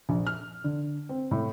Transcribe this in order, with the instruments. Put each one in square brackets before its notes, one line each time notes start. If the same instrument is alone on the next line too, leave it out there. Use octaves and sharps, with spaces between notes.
[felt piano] A#1
F6
D3
C4
A2